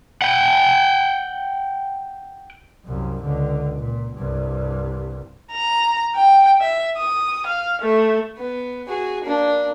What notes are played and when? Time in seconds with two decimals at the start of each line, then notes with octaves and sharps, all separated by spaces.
0.22 F#5 G5
2.85 C2 F#2
3.23 C#2 D3
3.78 A#2
4.14 C2 G2
5.52 A#5
6.15 G5
6.61 E5
6.97 D#6
7.47 F5
7.81 A3
8.37 B3
8.88 F#4 G#4
9.24 A#3 D4